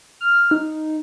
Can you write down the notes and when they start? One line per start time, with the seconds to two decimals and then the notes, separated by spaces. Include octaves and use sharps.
0.21 F6
0.51 D#4